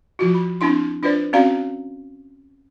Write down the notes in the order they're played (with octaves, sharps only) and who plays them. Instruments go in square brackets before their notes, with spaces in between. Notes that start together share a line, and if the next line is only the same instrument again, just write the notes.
[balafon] F3 F4 F#4
B5
C4 D4 E4 C6
D4 F4 B4 C5 D5
C4 C#4 F#4 D5 F5 A#5